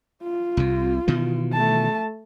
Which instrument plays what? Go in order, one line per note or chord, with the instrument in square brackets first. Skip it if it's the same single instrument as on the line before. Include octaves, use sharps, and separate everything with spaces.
[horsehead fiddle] F4
[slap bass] C2 C3
B2 D#3 E3
[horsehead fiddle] A3 A5